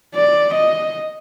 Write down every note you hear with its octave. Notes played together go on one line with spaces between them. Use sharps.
D5
D#5